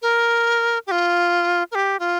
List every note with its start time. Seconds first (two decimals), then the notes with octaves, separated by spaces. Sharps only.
0.02 A#4
0.87 G4
0.91 F4
1.72 A#4
1.75 G4
2.00 F4